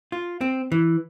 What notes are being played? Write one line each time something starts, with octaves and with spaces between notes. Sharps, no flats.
F4
C4
E3